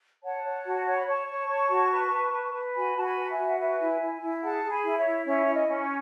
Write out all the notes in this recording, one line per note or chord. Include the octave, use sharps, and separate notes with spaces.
C#5 F#5 A5
C#5
F#4
C#5
B5
C#5 A5 C#6
C#5
C#5
F#4
B4
B4
B4
B4
F#4 G#5 B5
F#4 A5
G#5 B5
B4
A5
E5 G#5
F#4
F#5
B4 E5 G#5
E4
E4
E4
G#4 F#5 A5
G#4
G#5 B5
E4
C#5 E5
E4
C#4 C#5 E5
E4
D#5
C#4
C#5